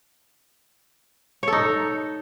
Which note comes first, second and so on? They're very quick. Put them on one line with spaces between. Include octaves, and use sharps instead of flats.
C#5 A4 D#4